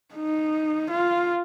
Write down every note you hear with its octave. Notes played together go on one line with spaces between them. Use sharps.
D#4
F4